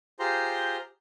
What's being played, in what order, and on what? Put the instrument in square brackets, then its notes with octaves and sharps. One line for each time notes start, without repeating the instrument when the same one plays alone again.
[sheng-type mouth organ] F4 G4 G#4 C5 A#5 C6